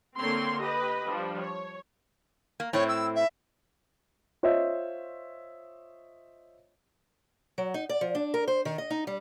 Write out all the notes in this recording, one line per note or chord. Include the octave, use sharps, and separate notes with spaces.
D3 A#3 C4 C#5 C6
G4 B4 D#5
F3 G3 D4
C#5
A#3
A2 C4 E4 C#5
E6
E5
F4 C5 C#5 D#5 E5
F#3
D#4
D5
F3
D4
A#4
C5
D#3
D#5
D#4
G3